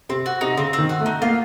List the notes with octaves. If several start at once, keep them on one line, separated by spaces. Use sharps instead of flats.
C3 C4
F#4
C3 D#4
C#3 C4
C4
D#3
F#4
A3
D#4
A#3 F4